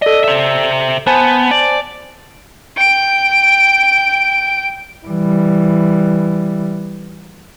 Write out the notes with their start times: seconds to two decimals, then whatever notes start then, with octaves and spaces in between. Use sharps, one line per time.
0.02 A4 D5 D#5
0.24 C5 E5
1.07 B3 C5 G#5 A5
1.51 D5
2.76 G5 D7
5.07 E3 G3